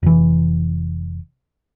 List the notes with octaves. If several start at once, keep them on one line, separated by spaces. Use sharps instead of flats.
F1 E3